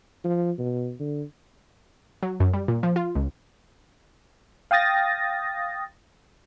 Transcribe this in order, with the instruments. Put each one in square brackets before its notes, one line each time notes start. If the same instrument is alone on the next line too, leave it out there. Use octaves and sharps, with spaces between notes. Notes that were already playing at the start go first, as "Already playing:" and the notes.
[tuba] F3
B2
D3
[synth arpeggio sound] F#3
F#2
G3
A#2
F3
F4
C#2
[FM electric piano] F5 G5 D#6 A6 A#6